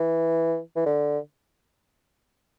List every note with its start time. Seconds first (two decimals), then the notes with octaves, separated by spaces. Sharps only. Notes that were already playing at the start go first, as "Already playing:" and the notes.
Already playing: E3
0.76 E3
0.86 D3